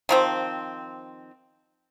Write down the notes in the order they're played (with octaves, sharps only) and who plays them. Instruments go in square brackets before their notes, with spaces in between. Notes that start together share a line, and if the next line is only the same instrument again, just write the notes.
[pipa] D#3 F3 C4